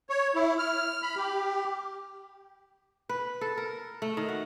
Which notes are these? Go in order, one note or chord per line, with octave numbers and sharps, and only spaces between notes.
C#5
E4
F6
B5
G4
B4
A4
A#4
A3
D#3
F#4